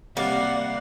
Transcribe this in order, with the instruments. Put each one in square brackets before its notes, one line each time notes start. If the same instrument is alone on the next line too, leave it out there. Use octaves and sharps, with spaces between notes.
[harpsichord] C3 G3 [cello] A#3 F#5 [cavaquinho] D5 [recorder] F5